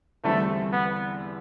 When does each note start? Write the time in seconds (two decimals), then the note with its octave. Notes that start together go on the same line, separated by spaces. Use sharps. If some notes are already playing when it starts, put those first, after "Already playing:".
0.24 E2 D3 G3 A3 C4 E4
0.72 B3